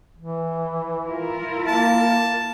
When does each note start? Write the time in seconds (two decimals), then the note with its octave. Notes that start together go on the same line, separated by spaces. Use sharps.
0.18 E3
1.05 E4 F4 A#4
1.67 A#3 A5